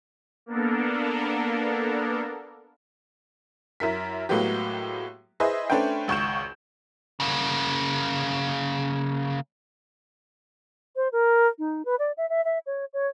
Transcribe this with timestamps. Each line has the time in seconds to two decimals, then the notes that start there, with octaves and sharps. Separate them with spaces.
0.46 A#3 B3 D4 A4 A#4
3.80 F#2 E4 A#4 B6
4.29 A2 F#3 G#3 A#3 B3 G4
5.40 E4 G#4 B4 C5 D#5 E5
5.70 A3 C#4 D4 B4 C5 G5
6.08 G#1 C#2 C#6 G6 E7
7.20 C#3 A#3
10.96 C5
11.12 A#4
11.59 D#4
11.85 B4
11.99 D5
12.17 E5
12.30 E5
12.45 E5
12.66 C#5
12.93 C#5